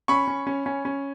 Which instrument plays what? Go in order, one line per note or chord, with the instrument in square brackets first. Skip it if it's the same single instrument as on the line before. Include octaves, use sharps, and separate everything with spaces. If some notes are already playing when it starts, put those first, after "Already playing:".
[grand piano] C#4 B5 C#6
C#4
C#4
C#4
C#4